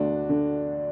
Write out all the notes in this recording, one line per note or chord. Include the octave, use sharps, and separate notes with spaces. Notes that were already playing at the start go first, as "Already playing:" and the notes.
Already playing: D2 D4 F#4
D3